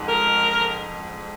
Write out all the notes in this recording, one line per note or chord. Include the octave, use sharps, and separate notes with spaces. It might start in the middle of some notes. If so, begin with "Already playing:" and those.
Already playing: F2 G#2
A#4